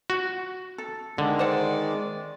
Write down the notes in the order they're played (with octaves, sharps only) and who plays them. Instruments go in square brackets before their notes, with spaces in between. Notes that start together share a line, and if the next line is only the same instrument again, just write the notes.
[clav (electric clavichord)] F#4
[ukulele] A4
[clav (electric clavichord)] D3 [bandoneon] D#3 G#3
[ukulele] C5 F#5 [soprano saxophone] D5